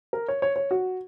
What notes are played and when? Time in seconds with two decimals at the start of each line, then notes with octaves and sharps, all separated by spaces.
0.13 A#4
0.28 C#5
0.42 C#5
0.56 C#5
0.71 F#4